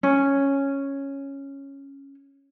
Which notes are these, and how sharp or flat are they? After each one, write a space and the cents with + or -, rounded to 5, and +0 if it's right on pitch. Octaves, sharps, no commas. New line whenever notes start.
C#4 -5